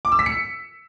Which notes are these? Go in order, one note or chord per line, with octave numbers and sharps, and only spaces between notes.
D6
E6
B6
C#7